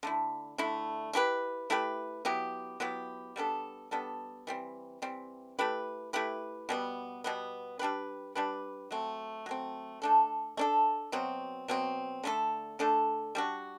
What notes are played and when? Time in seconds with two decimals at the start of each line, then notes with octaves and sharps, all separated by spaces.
0.03 D3 A3 E4
0.58 D3 A3 E4
1.13 A3 E4 G4 B4
1.70 A3 E4 G4 B4
2.25 F#3 B3 E4 G4
2.80 F#3 B3 E4 G4
3.36 G3 B3 D4 A4
3.91 G3 B3 D4 A4
4.47 E3 G3 C4
5.02 E3 G3 C4
5.59 A3 E4 G4 B4
6.13 A3 E4 G4 B4
6.69 B2 G3 B3
7.24 B2 G3 B3
7.79 G3 D4 G4 B4
8.35 G3 D4 G4 B4
8.91 F#3 A3 C4
9.46 F#3 A3 C4
10.02 A3 D4 A4
10.57 A3 D4 A4
11.12 B2 F#3 C4
11.68 B2 F#3 C4
12.24 D3 A3 D4 A4
12.79 D3 A3 D4 A4
13.35 G3 D4 F#4